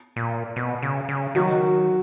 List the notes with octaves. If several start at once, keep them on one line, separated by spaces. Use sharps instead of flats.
A#2
B2
C#3
C#3
D#3 F#3 F#4